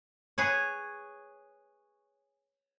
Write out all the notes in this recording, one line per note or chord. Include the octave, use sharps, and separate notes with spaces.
G#4 B4 C#5